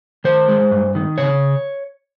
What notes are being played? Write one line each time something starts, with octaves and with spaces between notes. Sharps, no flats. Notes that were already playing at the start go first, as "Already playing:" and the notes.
D#3 C5
G#3
G2
D#3
C#3 C#5